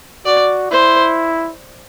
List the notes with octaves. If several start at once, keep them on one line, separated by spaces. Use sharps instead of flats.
F#4 D5
E4 C5